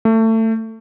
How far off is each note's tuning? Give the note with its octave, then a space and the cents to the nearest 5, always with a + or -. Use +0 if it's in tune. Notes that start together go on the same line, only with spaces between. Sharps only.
A3 +25